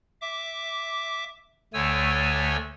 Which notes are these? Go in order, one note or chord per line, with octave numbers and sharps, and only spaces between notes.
E5 D6
D2 D3 A3 C#5 G#5 E6